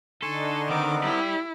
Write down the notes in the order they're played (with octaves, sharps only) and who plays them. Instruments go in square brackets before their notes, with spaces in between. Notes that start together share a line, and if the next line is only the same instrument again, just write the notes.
[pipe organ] D3 D4 D#4 [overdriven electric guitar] A4 [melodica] G#5 C6 C#6
[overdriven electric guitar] D#3 [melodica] B3 C4 A#4 [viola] D6
[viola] E4 [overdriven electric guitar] G4 D5